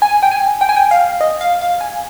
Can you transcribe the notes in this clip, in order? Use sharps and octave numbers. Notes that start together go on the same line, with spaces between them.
G#5
G5
G#5
G5
G#5
G5
F5
D#5
F5
F5
G#5